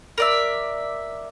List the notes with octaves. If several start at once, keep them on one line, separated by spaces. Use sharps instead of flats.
A#4 D5 E5